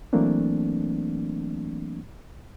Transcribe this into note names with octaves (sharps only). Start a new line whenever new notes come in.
E3 F#3 A3 A#3 C4 D4